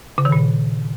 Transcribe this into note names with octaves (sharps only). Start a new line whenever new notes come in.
C#3
D#3
A#2